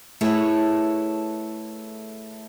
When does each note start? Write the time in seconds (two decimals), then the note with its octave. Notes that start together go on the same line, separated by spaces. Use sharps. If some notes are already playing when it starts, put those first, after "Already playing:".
0.21 A3 E4 G#4 A4 B4 C#5